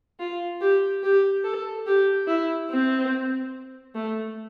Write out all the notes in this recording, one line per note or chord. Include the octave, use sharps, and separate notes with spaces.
F4
G4
G4
A4
G4
E4
C4
A3